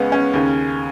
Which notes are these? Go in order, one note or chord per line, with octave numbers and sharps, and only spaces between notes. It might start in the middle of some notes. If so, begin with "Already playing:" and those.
Already playing: C#2 C#3 G#3 B3 C#4
C#4
D#2 C#3